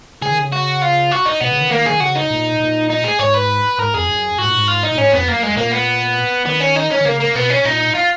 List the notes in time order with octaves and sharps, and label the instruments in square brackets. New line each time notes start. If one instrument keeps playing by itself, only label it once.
[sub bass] C#3 [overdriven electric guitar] G#4
[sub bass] D#3
C#3
[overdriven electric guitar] F#4
F4
F#4
D#4
[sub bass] B2 [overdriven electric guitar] B3
[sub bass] C#3
D#3
[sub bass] D#3 [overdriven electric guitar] A#3
[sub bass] D#3 [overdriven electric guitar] G#4
[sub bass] C#3 [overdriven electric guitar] F#4
[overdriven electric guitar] D#4
[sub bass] A#2
A#2
[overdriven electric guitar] D#4
G#4
[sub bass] G#2 [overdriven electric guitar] C#5
[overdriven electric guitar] B4
[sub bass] G#2 [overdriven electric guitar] A#4
[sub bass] F2 [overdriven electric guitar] G#4
[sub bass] F#2
[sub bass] G#2 [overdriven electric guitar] F#4
[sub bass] A#2
G#2
[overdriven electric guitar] F4
D#4
[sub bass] A#2
[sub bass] G#2 [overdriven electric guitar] C#4
[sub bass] F2 [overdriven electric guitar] B3
[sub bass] F#2 [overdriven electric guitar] A#3
[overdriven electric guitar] G#3
[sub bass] A#2 [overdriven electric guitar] A#3
[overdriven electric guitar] B3
[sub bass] D#3 [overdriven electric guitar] B3
[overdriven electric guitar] C#4
D#4
C#4
[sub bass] D#3
[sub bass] C#3 [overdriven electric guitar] A#3
[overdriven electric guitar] A#3
[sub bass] B2 [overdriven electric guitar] B3
[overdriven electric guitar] C#4
[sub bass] A#2 [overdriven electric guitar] D#4
[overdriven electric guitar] F4